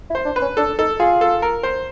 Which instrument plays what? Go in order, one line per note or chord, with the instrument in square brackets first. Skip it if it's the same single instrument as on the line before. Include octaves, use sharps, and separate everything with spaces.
[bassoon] E4
[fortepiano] C5
[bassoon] D4
[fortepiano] B4
[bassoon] C#4
[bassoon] D4 [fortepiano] A4
[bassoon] D#4 [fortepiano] A4
[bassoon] F4 [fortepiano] G#4
[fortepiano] A4
A#4
C5